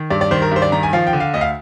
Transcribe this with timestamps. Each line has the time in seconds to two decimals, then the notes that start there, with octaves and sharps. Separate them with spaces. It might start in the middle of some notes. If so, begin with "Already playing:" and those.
Already playing: D#3
0.10 G2 D5
0.21 D5
0.31 D#3 C5
0.42 A#4
0.52 G2 C5
0.62 D5
0.72 D#3 A#5
0.83 G#5
0.93 F3 F5
1.07 G5
1.13 D3
1.20 F5
1.34 D2 D#5
1.41 F5